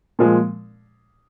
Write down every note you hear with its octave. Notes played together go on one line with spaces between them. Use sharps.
A#2 F3 G#3